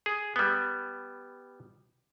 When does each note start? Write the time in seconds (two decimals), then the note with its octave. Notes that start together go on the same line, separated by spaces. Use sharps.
0.06 G#4
0.36 G3 B3